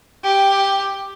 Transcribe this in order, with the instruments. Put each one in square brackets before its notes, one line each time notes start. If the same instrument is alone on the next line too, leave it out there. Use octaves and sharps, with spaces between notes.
[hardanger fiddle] G4